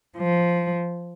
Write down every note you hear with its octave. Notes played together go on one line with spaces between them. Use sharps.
F3